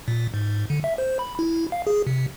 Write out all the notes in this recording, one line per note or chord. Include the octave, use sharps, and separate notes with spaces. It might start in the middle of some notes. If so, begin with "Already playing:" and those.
A#2
G#2
D3
E5
C5
B5
E4
F5
G#4
C3